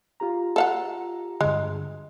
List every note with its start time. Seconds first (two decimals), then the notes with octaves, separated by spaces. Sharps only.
0.20 F4 G4 A#5
0.56 A4 F5 F#5
1.41 G2 D3 G#3